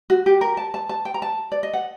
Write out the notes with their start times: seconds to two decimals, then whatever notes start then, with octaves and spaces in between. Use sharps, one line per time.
0.10 F#4
0.26 G4
0.41 A#4
0.57 A5
0.74 A5
0.89 A5
1.05 G5
1.14 A#5
1.22 A5
1.52 D5
1.63 D#5
1.73 F#5